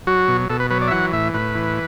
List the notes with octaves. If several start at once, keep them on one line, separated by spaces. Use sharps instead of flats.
F#3 F#4
B2
B2 A4
B4
F#3 B4
D5
E5
E3 F#5
A2 E5
A2 B4
E3